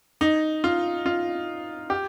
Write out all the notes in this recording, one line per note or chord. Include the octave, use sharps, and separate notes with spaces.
D#4
F4
F4
G4